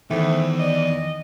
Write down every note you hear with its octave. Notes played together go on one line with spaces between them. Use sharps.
E2 D#3 E3 A3 C5
D5 D#5